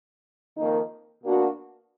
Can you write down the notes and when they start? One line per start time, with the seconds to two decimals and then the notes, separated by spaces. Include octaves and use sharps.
0.56 F2 D#3 A#3 D#4
1.23 B2 A#3 D4 F#4